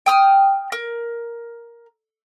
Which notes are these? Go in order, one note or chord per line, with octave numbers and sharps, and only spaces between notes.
G5 D#6 F6
A#4